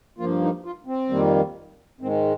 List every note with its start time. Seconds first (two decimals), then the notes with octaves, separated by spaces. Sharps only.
0.18 G2 F3 A#3 F4
0.42 D#4
0.65 F4
0.87 C4
1.10 F2 D#3 G3 A#3
2.01 G#2 D#3 G#3 C4